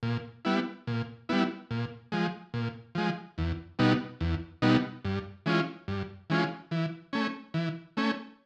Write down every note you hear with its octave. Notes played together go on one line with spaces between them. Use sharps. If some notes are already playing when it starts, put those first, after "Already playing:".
A#2
G3 B3 E4
A#2
G3 B3 E4
A#2
F3 G#3
A#2
F3 G#3
E2
B2 G3 B3 D#4
E2
B2 G3 B3 D#4
G2
E3 G#3 C#4 F4
G2
E3 G#3 C#4 F4
E3
A3 C#4
E3
A3 C#4